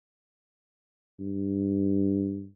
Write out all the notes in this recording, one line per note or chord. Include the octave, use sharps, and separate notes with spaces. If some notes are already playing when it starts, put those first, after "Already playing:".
G2